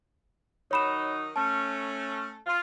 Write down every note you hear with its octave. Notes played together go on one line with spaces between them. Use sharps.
D#3 F#3 D#4 C#5 B5 E7
A3 C#4 A5
F4